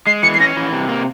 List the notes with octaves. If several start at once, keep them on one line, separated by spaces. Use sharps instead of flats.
G#3 C7
E3 C#7
C7
C#4 A#6
E3
C3
A#3